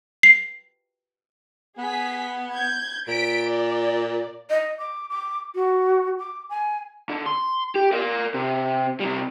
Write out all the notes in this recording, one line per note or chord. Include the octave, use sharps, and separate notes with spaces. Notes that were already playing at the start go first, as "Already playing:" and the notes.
C7
B3 G#4 B6
G6 G#6
A#2 B6 D7
D5
D#5
D6
D6
F#4
D6
G#5
D3
C6
G4
A#4 D5
C3
C3 G3